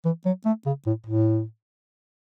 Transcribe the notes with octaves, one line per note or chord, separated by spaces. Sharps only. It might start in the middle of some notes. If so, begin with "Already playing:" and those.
E3
F#3
A3
C#3
A2
A2